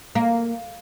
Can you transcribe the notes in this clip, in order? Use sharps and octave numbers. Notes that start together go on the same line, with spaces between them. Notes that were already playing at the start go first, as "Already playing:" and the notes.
A#3